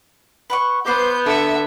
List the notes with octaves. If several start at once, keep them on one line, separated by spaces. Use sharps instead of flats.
B4 F#5 C#6
B3 B4 C5 D6 G6
D3 E5 F#5